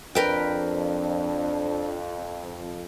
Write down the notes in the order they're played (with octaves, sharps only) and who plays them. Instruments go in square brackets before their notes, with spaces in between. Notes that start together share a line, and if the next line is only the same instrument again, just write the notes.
[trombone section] F2 [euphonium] D4 [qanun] A#4 B4 G5